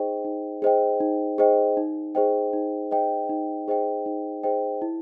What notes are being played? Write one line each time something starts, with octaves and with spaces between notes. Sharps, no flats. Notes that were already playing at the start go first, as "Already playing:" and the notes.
Already playing: D#4 G#4 C5 D#5 G5
D#4
G#4 C5 D#5 G5
D#4
G#4 C5 D#5 G5
D#4
G#4 C5 D#5 G5
D#4
G#4 C5 D#5 G5
D#4
G#4 C5 D#5 G5
D#4
G#4 C5 D#5 G5
E4